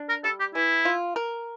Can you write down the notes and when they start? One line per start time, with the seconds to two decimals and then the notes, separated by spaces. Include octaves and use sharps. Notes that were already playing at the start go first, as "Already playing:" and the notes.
Already playing: D4
0.09 A#4
0.24 G3 A4
0.40 G4
0.55 E3 E4
0.85 F4
1.16 A#4